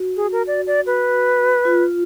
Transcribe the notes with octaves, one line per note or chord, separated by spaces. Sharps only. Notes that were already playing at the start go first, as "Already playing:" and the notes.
Already playing: F#4
G#4
A#4
D5
D5
B4
F4